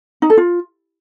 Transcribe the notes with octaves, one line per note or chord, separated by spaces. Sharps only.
D#4
A4
F4